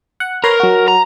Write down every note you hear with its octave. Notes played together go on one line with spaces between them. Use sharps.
F#5
A#4 B4 C#5 C6
F#3 F#4
A#5